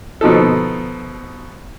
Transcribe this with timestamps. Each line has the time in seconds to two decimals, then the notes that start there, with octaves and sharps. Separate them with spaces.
0.21 B2 F3 D#4 A4